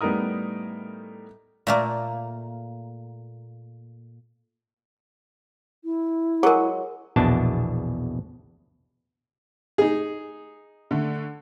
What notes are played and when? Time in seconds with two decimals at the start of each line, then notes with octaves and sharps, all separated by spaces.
0.01 A2 G3 B3 D#4 A#4 D#6
1.67 A#2 A3 A#3
5.84 E4
6.43 F#3 G#3 G#4 A#4
7.16 A#1 E2 B2 D4 A5
9.78 D#4 G#4
10.91 D3 A3